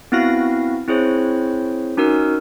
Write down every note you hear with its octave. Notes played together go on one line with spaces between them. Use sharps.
B3 C4 E4 F#4 F5 A#6
C4 E4 G#4 C5 C#5
C#4 D#4 F#4 A#4 E6